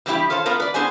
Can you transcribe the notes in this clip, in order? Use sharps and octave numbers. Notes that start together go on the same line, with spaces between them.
B2 E3 G3 C4 E4 G4
F4 A4 C5 C#5 F5
A3 B3 F4 A#4
B4 D5
A2 B3 D4 G#4 C5 G#5